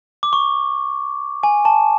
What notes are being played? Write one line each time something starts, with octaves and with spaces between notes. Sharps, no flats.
D6
C#6
G#5
A5